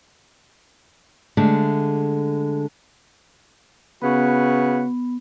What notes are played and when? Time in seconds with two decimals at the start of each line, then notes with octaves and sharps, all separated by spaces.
1.37 D3 G#3 A3
4.02 C#3 B3 F#4 B4